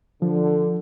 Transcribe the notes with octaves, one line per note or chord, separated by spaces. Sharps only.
D3 F3